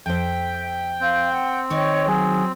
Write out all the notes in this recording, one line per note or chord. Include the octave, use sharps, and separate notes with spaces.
F2 C5 E5 G5
C4 F5 G6
F#5
D#3 D#4 C#5 D#5 G5 C#6
F#3 G#4